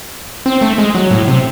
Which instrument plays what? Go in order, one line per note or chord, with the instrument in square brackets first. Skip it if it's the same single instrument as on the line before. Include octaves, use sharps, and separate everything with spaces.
[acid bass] C4
A3
G#3
F#3
A2
C3